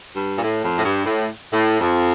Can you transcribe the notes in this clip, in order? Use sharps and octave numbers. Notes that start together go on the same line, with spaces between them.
G2
A#2
A2
F2
A2
G2
A2
A2
F2